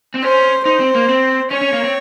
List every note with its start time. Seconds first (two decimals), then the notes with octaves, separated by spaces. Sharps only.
0.15 C4
0.23 C#4 C5
0.65 D#4 C5
0.80 C4
0.95 A#3
1.09 C4
1.51 C#4 C#5
1.61 C#4
1.73 A#3
1.84 C4